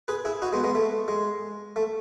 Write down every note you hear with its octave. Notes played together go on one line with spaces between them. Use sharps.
G#4 B4
E4 G#4
D#4 F#4
G#3 B3
G#3 B3
A3
G#3
A3